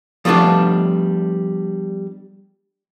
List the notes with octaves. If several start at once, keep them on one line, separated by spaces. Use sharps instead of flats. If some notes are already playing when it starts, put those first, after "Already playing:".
F3 G3 A3 B3 D4 F4